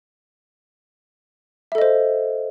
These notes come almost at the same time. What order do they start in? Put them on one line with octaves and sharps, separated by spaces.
E5 A4 D#5 C5